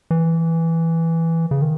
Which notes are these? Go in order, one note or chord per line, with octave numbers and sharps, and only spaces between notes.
E3
C#3
D#3